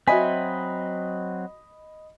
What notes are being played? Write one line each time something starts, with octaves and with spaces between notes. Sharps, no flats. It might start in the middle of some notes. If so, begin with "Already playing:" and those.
F#3 C4 F#4 D#5 E5 G#5 B5 B6